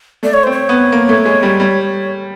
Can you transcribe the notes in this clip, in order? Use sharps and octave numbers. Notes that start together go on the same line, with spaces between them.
A3 D5
C#5
C4 C5
C#5
B3
A#3
A3
G#3
G3
G3